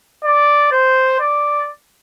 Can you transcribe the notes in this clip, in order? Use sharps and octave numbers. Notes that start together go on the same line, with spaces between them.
D5
C5
D5